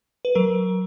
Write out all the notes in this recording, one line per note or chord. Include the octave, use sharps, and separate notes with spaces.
B4
F#3 A#4